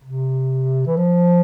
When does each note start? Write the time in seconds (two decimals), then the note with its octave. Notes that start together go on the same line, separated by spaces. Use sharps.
0.04 C3
0.87 E3
0.97 F3